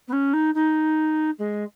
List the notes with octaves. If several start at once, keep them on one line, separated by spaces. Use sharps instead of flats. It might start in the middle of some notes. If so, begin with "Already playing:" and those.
B3
C#4
D#4
D#4
G#3